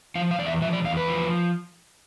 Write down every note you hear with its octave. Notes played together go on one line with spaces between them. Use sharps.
F3 F5
F5
E2 D5
E5
F3 E5
D5
E2 F5
B4
F3